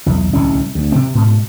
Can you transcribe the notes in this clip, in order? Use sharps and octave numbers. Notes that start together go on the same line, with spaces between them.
B1 E2
D1 C2 C3 C#4
D2
C3 C4
G#2 B2